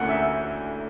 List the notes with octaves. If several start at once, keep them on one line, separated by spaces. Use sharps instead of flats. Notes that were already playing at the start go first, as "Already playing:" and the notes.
Already playing: D2 D3 A#3 C#4 E4 F#5
E5